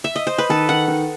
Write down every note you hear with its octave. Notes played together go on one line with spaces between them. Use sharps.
E5
D#5
C5
B4
D#3 A4
D#3 F#5
D#3